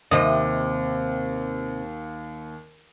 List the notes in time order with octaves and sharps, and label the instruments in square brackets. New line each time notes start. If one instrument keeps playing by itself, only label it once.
[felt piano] D#2 [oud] C3 D#5